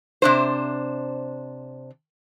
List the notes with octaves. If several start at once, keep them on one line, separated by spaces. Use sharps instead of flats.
C3 D4 C5